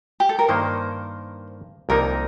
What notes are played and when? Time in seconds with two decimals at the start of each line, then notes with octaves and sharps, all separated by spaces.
0.20 G4
0.29 A4
0.39 A#4
0.48 G2 D#3 A#3 D#4 C5
1.89 C2 C3 F3 A#3 D#4 A#4